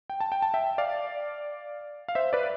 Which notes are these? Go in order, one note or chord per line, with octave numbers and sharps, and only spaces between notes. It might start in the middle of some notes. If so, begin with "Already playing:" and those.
G5
A5
G5
A5
E5 G5
D5 F5
F5
C5 E5
B4 D5